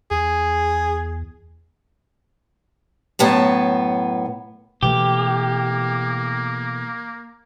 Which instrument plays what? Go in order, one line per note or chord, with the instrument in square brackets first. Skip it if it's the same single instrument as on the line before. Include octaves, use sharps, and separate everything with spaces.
[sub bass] E2 [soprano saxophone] G#4
[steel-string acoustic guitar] F#2 A2 B3 A5
[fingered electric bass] B2 E3 A3 [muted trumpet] A#3 [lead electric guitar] G4